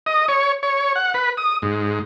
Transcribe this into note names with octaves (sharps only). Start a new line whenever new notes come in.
D#5
C#5
C#5
F#5
B4
D#6
G#2